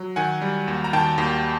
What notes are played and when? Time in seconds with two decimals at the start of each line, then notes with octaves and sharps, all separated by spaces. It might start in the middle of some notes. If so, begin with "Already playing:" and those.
Already playing: F#3
0.16 D#3 F#5 G#5
0.42 G3
0.68 D#2
0.84 A#5
0.93 D#3 G5 A5
1.18 D#2